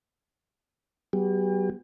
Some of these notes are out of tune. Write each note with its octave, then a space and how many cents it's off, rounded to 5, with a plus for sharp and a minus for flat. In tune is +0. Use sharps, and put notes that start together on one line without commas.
F#3 +40 B3 -5 G4 +45